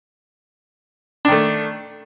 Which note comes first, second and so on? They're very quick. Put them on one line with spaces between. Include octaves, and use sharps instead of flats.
D4 D#3 A3